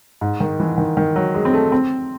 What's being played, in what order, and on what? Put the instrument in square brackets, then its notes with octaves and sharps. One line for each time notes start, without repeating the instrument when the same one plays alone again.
[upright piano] G#2
D#3
E3
D#3
D#3
F#3
G#3
C4
A3
C4